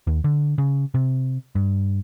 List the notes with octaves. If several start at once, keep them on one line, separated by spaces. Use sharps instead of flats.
D#2
D3
C#3
C3
G2